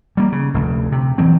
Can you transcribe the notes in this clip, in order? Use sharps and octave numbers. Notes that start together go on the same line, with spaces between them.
G3 A#3
C#3
F1 D2
C3
E3 F#3 C4